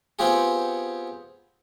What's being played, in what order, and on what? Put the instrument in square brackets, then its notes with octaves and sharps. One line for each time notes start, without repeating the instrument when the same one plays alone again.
[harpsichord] B3 C4 F4 G4 G#4